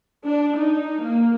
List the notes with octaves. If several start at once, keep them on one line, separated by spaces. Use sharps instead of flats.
D4
D#4
A#3